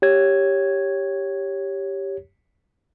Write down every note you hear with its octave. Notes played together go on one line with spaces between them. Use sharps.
G4 C#5 G#6